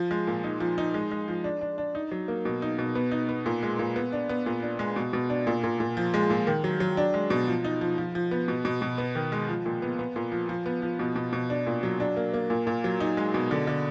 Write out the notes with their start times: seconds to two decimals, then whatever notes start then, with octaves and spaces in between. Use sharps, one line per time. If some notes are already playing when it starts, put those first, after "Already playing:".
Already playing: F3
0.11 G#3
0.27 A#2
0.44 D#4
0.60 F3
0.78 D#4
0.94 G#3
1.11 G#3
1.28 F3
1.44 D4
1.61 D4
1.78 D4
1.95 D#4
2.11 F#3
2.28 A#3
2.45 B2
2.62 D#4
2.79 B2
2.95 B3
3.11 D#4
3.29 B3
3.46 A#2
3.63 G#3
3.79 A#2
3.96 B3
4.12 D4
4.29 B3
4.46 A#2
4.63 D4
4.79 G#3
4.96 B2
5.13 B2
5.30 D4
5.47 A#2
5.64 A#2
5.80 A#2
5.97 F3
6.14 G#3
6.30 A#2
6.47 D#3
6.64 F#3
6.80 F#3
6.97 D4
7.14 G#3
7.30 B2
7.48 F3
7.64 D#4
7.81 F3
7.98 F3
8.15 F3
8.31 B3
8.48 B2
8.65 B2
8.82 B2
8.98 B3
9.15 D#3
9.32 G#3
9.49 F3
9.66 A#2
9.82 B3
9.99 B3
10.16 A#2
10.32 F3
10.49 F3
10.66 B3
10.82 F3
10.99 B2
11.16 B2
11.33 B2
11.50 D4
11.67 A#2
11.83 F#3
12.00 D4
12.17 A#3
12.34 A#3
12.50 A#2
12.67 A#2
12.84 F#3
13.00 D#4
13.17 G#3
13.34 B2
13.51 D3
13.67 D3